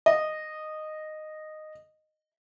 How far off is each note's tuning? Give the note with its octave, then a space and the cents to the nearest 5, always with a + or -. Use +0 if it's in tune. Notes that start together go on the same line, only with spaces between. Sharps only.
D#5 -10